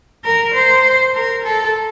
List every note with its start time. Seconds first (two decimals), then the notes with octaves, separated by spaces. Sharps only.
0.24 A#4
0.54 C5
1.15 A#4
1.45 A4